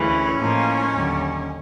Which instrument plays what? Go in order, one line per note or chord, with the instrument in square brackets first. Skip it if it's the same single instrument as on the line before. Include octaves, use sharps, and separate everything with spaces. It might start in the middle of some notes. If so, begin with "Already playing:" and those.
Already playing: [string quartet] D2 C#3 E3 [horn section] C#4
[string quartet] A2 F3 A#3 D#4
D#2 D3 F#3